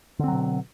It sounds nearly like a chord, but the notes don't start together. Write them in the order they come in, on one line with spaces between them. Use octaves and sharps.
D3 C4 F#3 B2